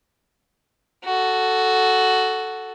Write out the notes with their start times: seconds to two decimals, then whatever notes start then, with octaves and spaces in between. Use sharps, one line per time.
1.05 F#4 A4